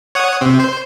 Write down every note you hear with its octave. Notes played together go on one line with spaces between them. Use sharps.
C#5 F#5 D#6
C3 C4
C5